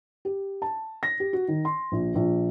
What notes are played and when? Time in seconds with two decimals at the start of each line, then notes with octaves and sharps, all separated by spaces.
0.25 G4
0.62 A5
1.03 A#6
1.20 G4
1.33 F#4
1.48 D#3
1.65 C6
1.92 A#1
2.15 A#1